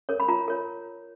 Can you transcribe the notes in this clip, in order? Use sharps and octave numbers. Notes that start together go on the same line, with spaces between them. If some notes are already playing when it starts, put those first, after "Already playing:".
A#4 C#5
B5
F4 A#5
A#4 C#5